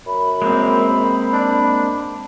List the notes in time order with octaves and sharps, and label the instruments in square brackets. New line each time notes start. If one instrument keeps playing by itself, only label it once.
[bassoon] F#2 [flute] B5
[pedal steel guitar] G#3 A#3 C4
[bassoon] D4